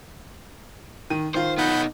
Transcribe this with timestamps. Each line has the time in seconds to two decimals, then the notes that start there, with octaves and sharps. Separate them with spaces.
1.10 D#3 D#7
1.35 D#3 F4 C5
1.58 B3 D#4 F#5 B5 G6